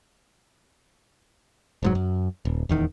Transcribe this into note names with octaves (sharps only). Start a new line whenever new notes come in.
F1 G#2 F#3
F#2
D#1
D#1 E2 D#3